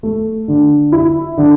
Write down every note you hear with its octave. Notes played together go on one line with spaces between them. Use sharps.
A3
D3
E4
D3